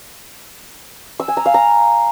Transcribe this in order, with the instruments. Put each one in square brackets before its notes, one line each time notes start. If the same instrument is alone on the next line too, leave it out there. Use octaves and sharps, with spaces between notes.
[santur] E6
G#5
A#5
F5
A#5